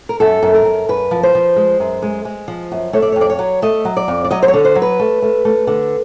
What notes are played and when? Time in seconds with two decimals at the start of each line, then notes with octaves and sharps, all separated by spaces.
0.09 A#4
0.20 F#2 A4
0.42 F#2
0.54 A#4
0.65 F#2
0.89 F#2 B4
1.11 F3
1.23 C5
1.35 F3
1.56 G#3
1.80 F#2
2.02 G#3
2.25 G#3
2.48 F3
2.72 F#2
2.93 A3 C#5
3.02 D5
3.12 C#5
3.16 F2
3.21 D5
3.30 C#5
3.39 F#3
3.62 A3 D#5
3.85 F#3
3.97 D5
4.08 F2
4.24 D5
4.31 F#3 D#5
4.42 C5
4.48 C#5
4.54 D3
4.65 C5
4.75 F#3
4.82 B4
4.99 A3
5.22 A3
5.45 A3
5.67 D3